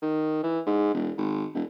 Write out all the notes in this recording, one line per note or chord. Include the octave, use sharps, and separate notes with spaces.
D#3
E3
G#2
E1
G#1
E1